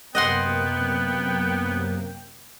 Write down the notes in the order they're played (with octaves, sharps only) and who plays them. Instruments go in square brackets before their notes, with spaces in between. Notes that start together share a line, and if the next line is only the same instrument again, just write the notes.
[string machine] F#2 C3 A#3 [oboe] B3 [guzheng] D#5 F#5 C6 [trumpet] G5